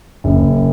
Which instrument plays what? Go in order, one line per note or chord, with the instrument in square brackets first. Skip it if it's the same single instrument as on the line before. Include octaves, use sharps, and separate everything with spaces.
[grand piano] F#1 F#2 C#3